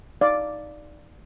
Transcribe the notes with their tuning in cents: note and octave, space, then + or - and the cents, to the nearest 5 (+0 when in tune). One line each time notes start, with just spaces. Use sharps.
D#4 +0 D5 +0 F5 +0